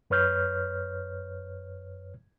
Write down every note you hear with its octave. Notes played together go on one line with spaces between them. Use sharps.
F#2 B4 C#5 F6 G6